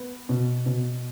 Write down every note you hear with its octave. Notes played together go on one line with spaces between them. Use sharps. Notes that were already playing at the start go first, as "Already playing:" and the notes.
Already playing: B3
B2
B2